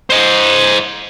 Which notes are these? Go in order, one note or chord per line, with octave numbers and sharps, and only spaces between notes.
C5 D#5